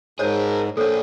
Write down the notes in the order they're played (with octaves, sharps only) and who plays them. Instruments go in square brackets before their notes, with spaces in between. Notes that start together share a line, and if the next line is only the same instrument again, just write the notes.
[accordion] G#2 [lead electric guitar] G#4 A#4 [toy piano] C5 C#5
[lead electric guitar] A#2 D4 [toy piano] A4 C5 C#5